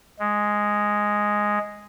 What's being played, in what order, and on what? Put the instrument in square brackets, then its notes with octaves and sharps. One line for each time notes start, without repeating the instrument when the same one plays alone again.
[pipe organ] G#3